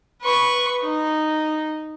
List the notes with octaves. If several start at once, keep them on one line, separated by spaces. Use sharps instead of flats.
B4 C#6
D#4